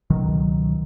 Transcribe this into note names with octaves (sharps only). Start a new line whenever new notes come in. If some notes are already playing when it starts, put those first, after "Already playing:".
C#2 B2 D#3 F#3